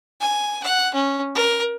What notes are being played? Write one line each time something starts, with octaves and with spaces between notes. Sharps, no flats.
G#5
F#5
C#4
A#4